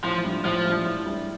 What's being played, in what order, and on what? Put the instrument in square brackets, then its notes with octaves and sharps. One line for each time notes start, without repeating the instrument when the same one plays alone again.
[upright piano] A2 [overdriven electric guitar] F3
[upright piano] G3 D4
[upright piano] A2 [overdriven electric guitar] F3
[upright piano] G3 D4
A2
G3 D4